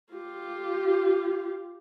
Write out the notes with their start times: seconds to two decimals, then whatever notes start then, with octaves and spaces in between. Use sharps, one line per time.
0.13 F4 G4